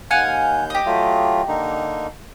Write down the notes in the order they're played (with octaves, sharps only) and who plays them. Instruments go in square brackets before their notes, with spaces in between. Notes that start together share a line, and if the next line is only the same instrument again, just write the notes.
[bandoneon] D#2 G6 [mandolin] F5 F#5 G#5
[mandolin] G4 D#5
[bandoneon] F#3 A3 F4
D3 A#3 D#4